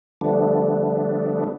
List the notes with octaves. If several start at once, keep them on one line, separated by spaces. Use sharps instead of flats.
D3 F3 G3 A3 B3 D4